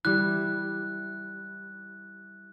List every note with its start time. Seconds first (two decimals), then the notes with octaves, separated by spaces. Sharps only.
0.05 G3 E4 F#6